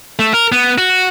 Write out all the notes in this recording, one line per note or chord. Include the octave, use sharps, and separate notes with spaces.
A3
A#4
B3
F#4